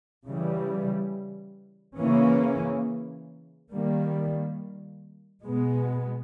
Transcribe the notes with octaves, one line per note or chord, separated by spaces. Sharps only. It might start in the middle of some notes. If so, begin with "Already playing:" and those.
C#3 E3 G3
C#3 E3 A#3 C#4
D#3 G3 A#3
B2 G#3 B3